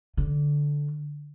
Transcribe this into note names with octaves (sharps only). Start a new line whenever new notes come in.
D3